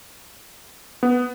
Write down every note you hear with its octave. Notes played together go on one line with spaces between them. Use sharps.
B3